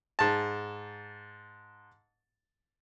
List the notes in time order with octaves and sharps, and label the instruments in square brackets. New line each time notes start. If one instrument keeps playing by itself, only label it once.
[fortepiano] G#2 A5